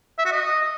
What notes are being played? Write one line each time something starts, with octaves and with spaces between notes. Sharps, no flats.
E5
F#4
D#5